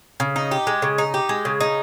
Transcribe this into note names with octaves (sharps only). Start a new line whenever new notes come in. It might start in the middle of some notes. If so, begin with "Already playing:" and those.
C#3
D#4
G4
G#3
C#3
D#4
G4
G#3
C#3
D#4